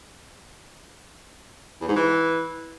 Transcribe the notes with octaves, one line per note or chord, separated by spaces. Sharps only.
E2
G#2
E3